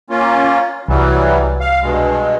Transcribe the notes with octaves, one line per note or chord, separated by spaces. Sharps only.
A#3 C#4 F4
C2 E3 F#3 G3
F5
G2 B2 G#3